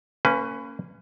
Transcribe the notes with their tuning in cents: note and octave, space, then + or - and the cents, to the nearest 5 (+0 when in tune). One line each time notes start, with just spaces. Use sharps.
A#3 -25 C#4 +0 B4 +20